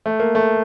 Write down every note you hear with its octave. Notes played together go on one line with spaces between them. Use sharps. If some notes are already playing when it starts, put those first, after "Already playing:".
A3
A#3
A3